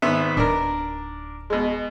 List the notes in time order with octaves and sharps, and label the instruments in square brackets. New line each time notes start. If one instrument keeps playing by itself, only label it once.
[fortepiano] G#1 B3 E5
[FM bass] D1 [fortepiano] D4 A#4
[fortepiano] B2 G#3